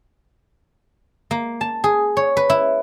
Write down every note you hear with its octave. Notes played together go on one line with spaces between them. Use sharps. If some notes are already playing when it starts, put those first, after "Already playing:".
A#3
A5
G#4
C#5
B4
E4